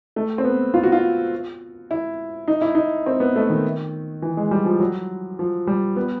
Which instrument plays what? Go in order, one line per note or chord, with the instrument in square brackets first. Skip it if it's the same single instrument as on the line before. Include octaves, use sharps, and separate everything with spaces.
[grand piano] A3
C4
B3
F4
F#4
F4
E4
D#4
E4
D#4
C4
B3
A3
D#3
E3
G#3
G3
F3
F#3
F3
G3
B3